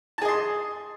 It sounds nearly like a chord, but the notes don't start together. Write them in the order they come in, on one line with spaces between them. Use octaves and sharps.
A5 G#4 D#5 C6